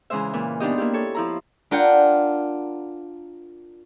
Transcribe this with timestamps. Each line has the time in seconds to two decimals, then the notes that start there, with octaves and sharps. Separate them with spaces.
0.10 C#3 E3 G#3 C5 E5
0.33 A#2 E3
0.60 B3 D4 D#4 G4 D#5
0.78 A#3 E4 G4
0.93 A4 C#5
1.15 F3 E4 A#5
1.71 D4 F4 A#4 F#5 G5